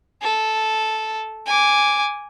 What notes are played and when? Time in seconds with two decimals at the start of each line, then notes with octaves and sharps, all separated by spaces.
0.22 A4
1.46 G#5 D6